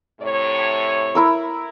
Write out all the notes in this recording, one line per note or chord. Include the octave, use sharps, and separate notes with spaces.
A2 C3 C#5
E4 A#4 E6